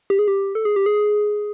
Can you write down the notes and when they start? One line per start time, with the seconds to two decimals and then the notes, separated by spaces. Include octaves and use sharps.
0.10 G4
0.19 G#4
0.28 G4
0.55 A4
0.65 G#4
0.76 G4
0.86 G#4